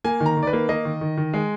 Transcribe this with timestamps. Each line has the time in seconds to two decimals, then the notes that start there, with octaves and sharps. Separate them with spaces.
0.04 A#3 G#5
0.20 D#3
0.26 A#5
0.37 D#3
0.43 D5
0.47 B4
0.53 A#3
0.69 A#3 D#5
0.85 D#3
1.01 D#3
1.17 D#3
1.34 G#3